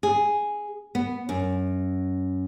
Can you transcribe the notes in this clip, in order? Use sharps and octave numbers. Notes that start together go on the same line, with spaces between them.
G#4
B3
F#2